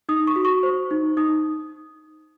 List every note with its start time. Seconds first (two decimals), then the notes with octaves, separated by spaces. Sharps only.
0.09 D#4 D#6
0.27 C#6
0.36 F#4
0.45 C#6
0.63 C5
0.91 D#4
1.17 D#4 D#6